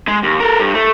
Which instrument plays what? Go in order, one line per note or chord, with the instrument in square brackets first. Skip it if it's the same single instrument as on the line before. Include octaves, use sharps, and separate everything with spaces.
[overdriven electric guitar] G#3
D#2
A4 A#4
G2
A3